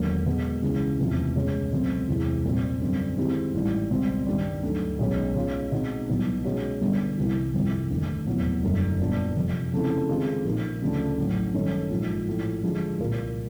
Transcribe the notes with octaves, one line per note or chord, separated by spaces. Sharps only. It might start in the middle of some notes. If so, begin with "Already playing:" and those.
Already playing: E1 D#2 D3 F#3 A#3
B2 G#3 B3
C#2 C#3 E3 G#3
F1 E2 C3 F3
C#2 B2 G#3 C#4
C#2 B2 F#3 A3 C4
E2 C3 E3 G#3 C4
A#1 A#2 G3 C4
F#2 D3 G3 C4
D#3 G#3 C4 E4 G4
A1 G#2 E3 G3
C#2 B2 G3 C4
G2 D#3 G3
D2 D3 F#3
B1 B2 G#3 C#4
B2 G#3 C#4 F4
B2 G#3 C4 D#4
C2 B2 F#3 B3 D#4
B2 G#3 C#4 F#4
G1 G2 D3 G3 B3
C2 C3 E3
G1 F2 C3 E3
F1 D#2 D3
F1 E2 B2 F#3 B3
F#1 F#2 D3 G3
A#2 G3 B3 D4
F2 C3 F3
C#3 F3 A3 C4 E4
D#3 G#3 C4 F4 G#4
A#1 A#2 F3 A#3 D#4
D2 C#3 F3 A3 D4
A1 A2 F#3
G2 D#3 F#3 A3 C#4
A#1 G#2 F3
A#1 A2 F3
D3 F3 G#3
C2 A#2 G3 A#3